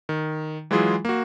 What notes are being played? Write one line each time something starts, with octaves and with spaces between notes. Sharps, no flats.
D#3
E3 F#3 G#3 E4 F4 G#4
A#3 F#4